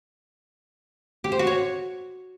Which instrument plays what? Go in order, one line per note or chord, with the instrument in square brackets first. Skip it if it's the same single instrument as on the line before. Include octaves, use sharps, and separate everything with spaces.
[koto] G4
C5
F#4
C#5